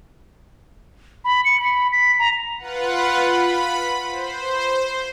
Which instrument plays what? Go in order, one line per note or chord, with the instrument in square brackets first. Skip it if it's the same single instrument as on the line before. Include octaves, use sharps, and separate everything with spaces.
[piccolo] B5
C#7
B5
B6
A#5
[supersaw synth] F4 B4 F#5
B5
C5